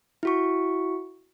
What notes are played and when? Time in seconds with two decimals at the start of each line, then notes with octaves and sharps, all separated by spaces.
0.23 E4 F#4 C#6